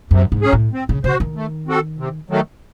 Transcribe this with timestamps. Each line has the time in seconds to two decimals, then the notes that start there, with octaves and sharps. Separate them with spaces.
0.11 F#2 C3
0.32 G#2
0.42 F#3 C#4 G#4
0.53 A2
0.73 C4
0.89 C#3
1.04 C#3 F#4 C5
1.20 D#3
1.36 A3
1.67 C4 F#4 A4
1.98 C3
2.30 D#3 F#3 A3